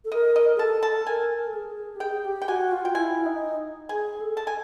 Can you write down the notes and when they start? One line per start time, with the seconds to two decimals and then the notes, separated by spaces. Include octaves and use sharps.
0.05 A4
0.12 A#4 D#5
0.36 D#5
0.56 G#4
0.59 A4 A5
0.83 A5
1.06 A#4 G#5
1.47 A4
1.54 G#4
1.96 G4
2.00 G#4 G5
2.25 G4
2.42 G5
2.48 F#4 G#5
2.72 F4
2.85 G5
2.95 E4 G#5
3.26 D#4
3.89 G#4 G#5
4.20 A4
4.37 A5
4.47 G#5